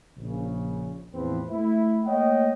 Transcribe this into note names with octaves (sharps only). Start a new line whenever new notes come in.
A#1 C#3
E2 A2 E3 F3 C4 B4
A3 E4
A3 A#3 C#5 D#5 F#5 G5